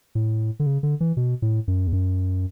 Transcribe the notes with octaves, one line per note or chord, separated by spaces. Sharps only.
A2
D3
C#3
D3
E3
B2
A2
F#2
E2
F#2